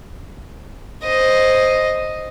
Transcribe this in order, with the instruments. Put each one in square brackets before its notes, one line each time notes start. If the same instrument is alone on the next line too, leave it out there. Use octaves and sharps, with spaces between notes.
[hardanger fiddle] C5 D#5